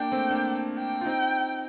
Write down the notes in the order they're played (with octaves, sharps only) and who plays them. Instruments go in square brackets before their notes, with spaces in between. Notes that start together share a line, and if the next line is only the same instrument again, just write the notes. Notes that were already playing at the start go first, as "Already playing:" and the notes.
Already playing: [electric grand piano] A#3 D4 [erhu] G5
[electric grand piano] A3 C4
A#3 D4
[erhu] G5
[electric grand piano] F4
C4 D#4